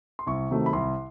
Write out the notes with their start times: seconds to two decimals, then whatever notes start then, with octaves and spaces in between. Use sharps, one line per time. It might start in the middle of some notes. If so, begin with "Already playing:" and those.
0.19 C6
0.27 C2 C#6
0.51 C3 D#3 F#3 A3
0.66 B5
0.73 C2 C6